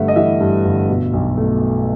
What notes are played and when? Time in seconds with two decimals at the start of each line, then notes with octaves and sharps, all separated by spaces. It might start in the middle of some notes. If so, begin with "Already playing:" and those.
Already playing: G1 G2 A3 E5 F#5
0.08 D#5
0.16 E3 E5
0.40 G2
0.65 G1
0.89 B2
1.13 B1
1.37 A3